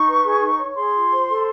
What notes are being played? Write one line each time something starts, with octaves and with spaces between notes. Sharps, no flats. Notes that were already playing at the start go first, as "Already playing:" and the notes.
Already playing: D#4 C#6
B4
G#4
D#4
C#5
G#4 C6
F4
C5
A4